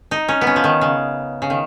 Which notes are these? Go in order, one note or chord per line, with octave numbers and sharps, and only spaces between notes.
D#4
C#4
B3
C#4
F3
D#3
C#3
C#3
D#3